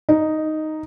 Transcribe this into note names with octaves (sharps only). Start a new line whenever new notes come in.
D#4